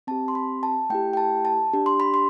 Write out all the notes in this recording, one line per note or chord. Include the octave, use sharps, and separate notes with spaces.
C4 G4 A5
C6
B5
A5
A3 E4 G4 G5
G5
A5
A5
D4 G4
C6
B5
C6